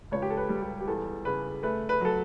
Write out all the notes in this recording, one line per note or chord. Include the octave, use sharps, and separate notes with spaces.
C#2 C#5
G4
A4
B4
G3
G4
G4
E2 A4
C#3 B4
A3 B4
B4
F#3 A4